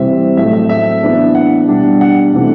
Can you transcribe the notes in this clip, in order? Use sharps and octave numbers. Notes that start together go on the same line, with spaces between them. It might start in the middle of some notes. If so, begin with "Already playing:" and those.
Already playing: C3 E3 G3 C4 E5
A2 F#3 A3 C4 E5
E5
E5
E3 B3 D4
F#5
B2 G3 D4
F#5
C3 E3 A3 D4